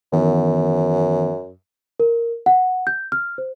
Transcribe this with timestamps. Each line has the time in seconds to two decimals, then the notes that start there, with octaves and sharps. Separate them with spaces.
0.13 F#2 D#3 E3 B3
2.00 A#4
2.46 F#5
2.87 G6
3.12 F6
3.38 C5